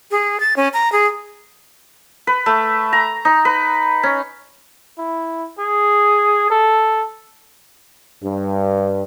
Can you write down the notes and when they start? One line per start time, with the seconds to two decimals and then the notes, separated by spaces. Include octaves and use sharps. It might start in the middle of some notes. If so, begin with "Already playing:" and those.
0.11 G#4
0.40 A6
0.57 C#4
0.74 A#5
0.92 G#4
2.27 B4
2.46 A3
2.93 A#5
3.25 D#4
3.45 B4
4.03 C#4
4.98 E4
5.59 G#4
6.50 A4
8.22 G2